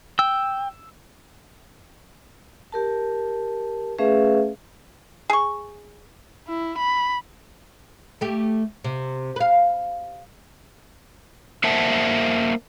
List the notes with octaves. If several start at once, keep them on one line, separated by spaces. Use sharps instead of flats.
G5 E6
G4 A#4 A5
A3 C#4 G#4 B4 E5 F5
G#4 C#6
E4
B5
A3 G4
C3
B4 F5
A#3 A#4 C5 E5 F#5 A5